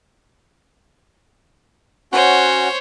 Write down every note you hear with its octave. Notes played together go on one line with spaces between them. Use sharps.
C#4 F#4 C5 C#5 F#5